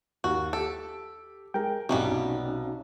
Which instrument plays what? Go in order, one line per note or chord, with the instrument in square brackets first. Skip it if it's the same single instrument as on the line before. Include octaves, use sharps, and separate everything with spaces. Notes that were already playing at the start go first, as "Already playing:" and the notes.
[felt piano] D#2 [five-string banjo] F#4
[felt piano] G4 D7 [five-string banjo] A4
[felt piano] G#3 A#4 [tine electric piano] G5
[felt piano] B1 C3 [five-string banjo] E3 G3 B3 [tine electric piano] C#4 D#4 F#4